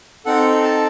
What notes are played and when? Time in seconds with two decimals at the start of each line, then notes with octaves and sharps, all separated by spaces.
0.25 C4 D#4 A4 F#5
0.64 A5